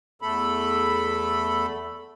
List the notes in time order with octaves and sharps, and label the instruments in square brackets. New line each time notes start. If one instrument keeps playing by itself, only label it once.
[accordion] E2 A3 A4 B5